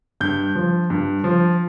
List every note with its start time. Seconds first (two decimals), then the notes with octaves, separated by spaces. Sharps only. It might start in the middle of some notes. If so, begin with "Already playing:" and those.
0.21 G2 G6
0.55 F3
0.90 G2
1.24 F3